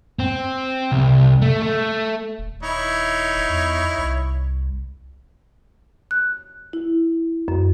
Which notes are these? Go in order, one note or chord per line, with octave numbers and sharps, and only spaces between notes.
C4
C2
A3
A3
D#1
D#4 E4 C#5
E2
C2
F#6
E4
F#2